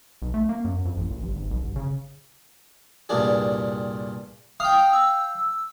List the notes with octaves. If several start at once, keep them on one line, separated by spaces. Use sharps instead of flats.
B1
A3
A#3
F#2
F2
A1
A#1
G1
G#1
B1
G1
C#3
C2 G2 A#2 D4 G#4
F5 G5 D#6
E6